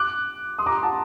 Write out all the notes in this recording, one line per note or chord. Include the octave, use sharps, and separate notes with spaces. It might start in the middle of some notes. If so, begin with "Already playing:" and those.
Already playing: D6 F#6
C6 D#6
A#5 D6
F#5 A5